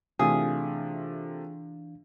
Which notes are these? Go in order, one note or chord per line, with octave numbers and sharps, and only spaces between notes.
C3 E3 A3 D4 F4 G#4 F5